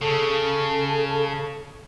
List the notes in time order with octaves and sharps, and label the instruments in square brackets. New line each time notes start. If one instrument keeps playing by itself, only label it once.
[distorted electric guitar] C#3 [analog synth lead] A4